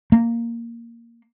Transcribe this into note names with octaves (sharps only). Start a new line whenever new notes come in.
A#3